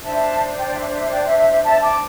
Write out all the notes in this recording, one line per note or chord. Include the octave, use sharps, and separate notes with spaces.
D4 C5 E5 A5
D5 G5
E5
E5
D5 G5
E5
E5
E5
E5 A5
A5 D6